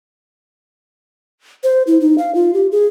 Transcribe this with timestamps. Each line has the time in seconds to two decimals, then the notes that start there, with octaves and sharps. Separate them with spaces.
1.64 C5
1.87 E4
2.01 D#4
2.18 F5
2.35 F4
2.54 G4
2.72 G#4